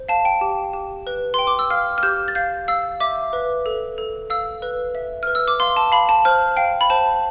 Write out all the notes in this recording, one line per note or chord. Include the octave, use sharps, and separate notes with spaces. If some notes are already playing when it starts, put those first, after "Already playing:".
Already playing: C5
F5 A5
G5
G4
G4
B4
G5 C6
D6
E6
F5 F6
F6
G4 G6
A6
F5 G6
F5 E6
E5 D6
B4
A4
A4
F5 E6
B4
E5
B4 F6
E6
D6
F5 C6
A5
F5 B5
A5
C5 F6
F5 G5
B5
C5 A5